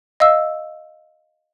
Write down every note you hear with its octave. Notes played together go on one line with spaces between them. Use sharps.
D#5 F5 E6